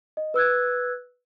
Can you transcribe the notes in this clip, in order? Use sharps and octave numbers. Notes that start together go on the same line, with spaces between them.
D#5
B4 E6 F#6 G#6